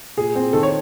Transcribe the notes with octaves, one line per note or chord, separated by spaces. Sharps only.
A#2 G#4
C4
D#3 A4
C#5